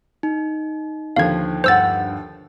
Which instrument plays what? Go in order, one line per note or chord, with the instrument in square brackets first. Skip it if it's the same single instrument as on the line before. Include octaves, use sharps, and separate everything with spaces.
[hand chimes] D#4
[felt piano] D#2 D3 F3 [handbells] F5 G#6
[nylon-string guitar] G2 F#5 [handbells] C5 E6 A6